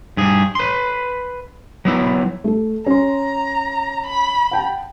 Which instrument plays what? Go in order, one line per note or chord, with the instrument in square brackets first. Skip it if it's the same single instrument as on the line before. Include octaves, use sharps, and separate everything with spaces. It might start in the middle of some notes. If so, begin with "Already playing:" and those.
[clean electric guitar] G2 G#4
B4 C6
F#3 B3 E4
[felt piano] A3 A4
[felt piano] C#4 C6 [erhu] A#5
[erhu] B5
[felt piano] F#5 G5 A5